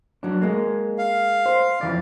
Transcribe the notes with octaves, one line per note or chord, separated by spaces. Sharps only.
F#3 D4
G#3 A#3
F5
C5
F2 E3 D5